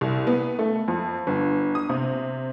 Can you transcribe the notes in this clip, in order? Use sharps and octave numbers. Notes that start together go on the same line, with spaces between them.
C2
B3
A3
F2
G1
D#6
C3